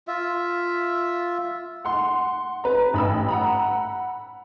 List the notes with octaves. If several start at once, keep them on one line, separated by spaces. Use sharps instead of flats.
F4 E5
F#5 C6
B4 A#5
A1 B5 E6
F#5 A#5 B5